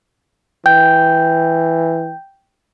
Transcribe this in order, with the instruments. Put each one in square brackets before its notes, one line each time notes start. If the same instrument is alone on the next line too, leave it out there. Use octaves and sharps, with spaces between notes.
[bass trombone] E3 [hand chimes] G5 G6